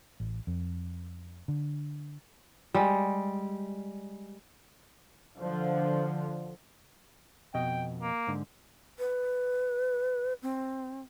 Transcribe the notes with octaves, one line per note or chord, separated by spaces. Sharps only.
A1
F2
D3
G3 G#3
D3 F3
F2 B2 D#5 G5
A#3
G#2 D3
B4
C4